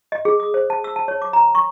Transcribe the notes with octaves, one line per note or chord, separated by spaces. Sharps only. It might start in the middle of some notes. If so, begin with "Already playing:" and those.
D#5
G#4
D#6
C5
A5
E6
A5
C#5
D6
A#5
C#6